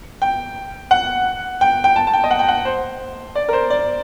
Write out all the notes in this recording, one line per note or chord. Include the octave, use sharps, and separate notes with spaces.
G5
F#5
G5
G5
A5
A5
G5
D#5
F#5
G5
F#5
C5
D5
A#4
C5
D5